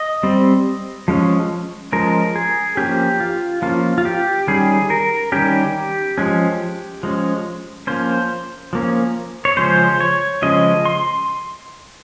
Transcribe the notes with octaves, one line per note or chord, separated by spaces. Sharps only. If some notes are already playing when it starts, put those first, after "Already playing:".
Already playing: D#5
G3 C4
F3 G#3 C#4
F3 G#3 C#4 A#4
G#4
F3 A#3 C#4 G4
F4
F3 A#3 C#4 F4
F4
G4
D#3 G3 C#4 G#4
A#4
D#3 G3 C#4 G4
F3 G#3 C#4
F3 G#3 C#4
F3 A#3 C#4 C5
F3 A#3 C#4
C#5
C#3 F3 G#3 C#4 C5
C#5
C#3 F3 G#3 C#4 D#5
C6